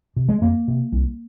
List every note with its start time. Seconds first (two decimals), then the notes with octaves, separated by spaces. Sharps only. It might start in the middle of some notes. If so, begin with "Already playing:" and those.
0.16 C3
0.29 G#3
0.41 F2 A#3
0.68 C3
0.92 C2